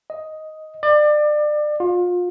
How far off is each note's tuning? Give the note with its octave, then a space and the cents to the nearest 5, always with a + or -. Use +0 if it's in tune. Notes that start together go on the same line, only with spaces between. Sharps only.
D#5 +5
D5 +30
F4 +30